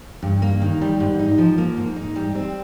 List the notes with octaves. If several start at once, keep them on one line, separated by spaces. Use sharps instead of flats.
G2
A#3
D#3
G3
G#2
D#4
F3
A#3
G#2
D#4
G3
C4